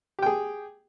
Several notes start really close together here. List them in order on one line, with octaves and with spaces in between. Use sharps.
G4 G5 G#4